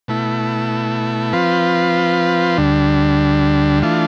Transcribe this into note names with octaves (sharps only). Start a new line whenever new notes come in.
B2 A3 E4
F3 C4 F4 B4
D2 D3 G3 D4
E3 A3 D4 F4